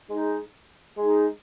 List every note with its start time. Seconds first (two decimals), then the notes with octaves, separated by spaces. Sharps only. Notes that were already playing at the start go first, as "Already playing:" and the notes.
0.08 G#3 D#4 G#4
0.97 G#3 D#4 G#4